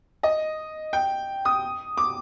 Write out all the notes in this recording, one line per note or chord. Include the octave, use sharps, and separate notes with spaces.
D#5
G5
D#6
D6